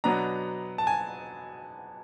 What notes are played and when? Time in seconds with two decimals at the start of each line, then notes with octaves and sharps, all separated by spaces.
0.04 B2 F#3 B3 D4 A#5
0.78 A5
0.87 G#5